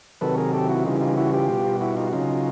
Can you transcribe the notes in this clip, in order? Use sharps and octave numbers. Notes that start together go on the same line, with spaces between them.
C3 D#3 F#3 A4 B4
G#4 A#4
G4 A4
E4 F#4
C#3 E3 G3 D#4 F4
D#4 F4
E4 F#4
F4 G4
B2 G3
E4 F#4
D#4 F4
F#4
C#3 F#3 D#4 F4